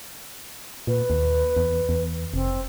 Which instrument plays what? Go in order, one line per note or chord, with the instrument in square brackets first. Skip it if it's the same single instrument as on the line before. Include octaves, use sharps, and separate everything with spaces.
[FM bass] A#2 [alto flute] B4
[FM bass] D#2
E2
E2
[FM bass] F1 [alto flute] C4